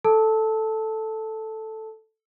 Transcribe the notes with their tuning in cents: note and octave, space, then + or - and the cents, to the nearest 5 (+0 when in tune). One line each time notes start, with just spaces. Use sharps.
A4 +0 A5 +0 E6 -25